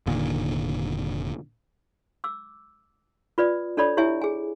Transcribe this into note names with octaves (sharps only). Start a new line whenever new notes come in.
F1 A#2 D3 D#3
D6 E6
F4 B4 D5 D#6
D4 A4 C#5 D5 B5 D#6
E4 G4 C#5 E5 G#5
G#4 G#5